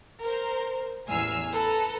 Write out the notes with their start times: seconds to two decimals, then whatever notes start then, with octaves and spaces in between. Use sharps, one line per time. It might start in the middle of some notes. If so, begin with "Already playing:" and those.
0.21 A#4 C5
1.08 A1 E2 G#5 E6 F6 C7
1.52 A4 B4 A#5